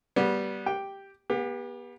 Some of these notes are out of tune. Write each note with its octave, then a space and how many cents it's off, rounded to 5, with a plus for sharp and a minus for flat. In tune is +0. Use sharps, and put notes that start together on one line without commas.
G3 -10 B3 -20
G4 +0 G5 +0
B3 -35 G4 +30